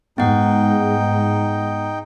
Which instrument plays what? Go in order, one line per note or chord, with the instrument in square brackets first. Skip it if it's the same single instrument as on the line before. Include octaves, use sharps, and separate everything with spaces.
[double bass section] G#2 G#3 [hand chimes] B3 F#5 [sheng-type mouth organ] D#4 G5